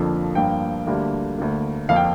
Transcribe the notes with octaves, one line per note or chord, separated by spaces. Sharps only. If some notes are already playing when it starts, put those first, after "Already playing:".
Already playing: F2 D3 F3 A#3
G2 F3 A#3 G5
D2 D3 G3 A#3
D2 D3 A#3
F2 F3 A#3 F5
G5